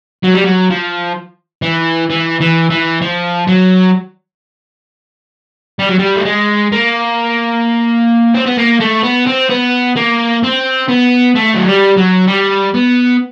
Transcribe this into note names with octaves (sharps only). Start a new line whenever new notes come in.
F#3
G3
F#3
F3
E3
E3
E3
E3
F3
F#3
G3
F#3
G3
A3
G#3
A#3
C4
B3
A#3
A3
B3
C4
B3
A#3
C4
B3
A3
F#3
G3
F#3
G3
B3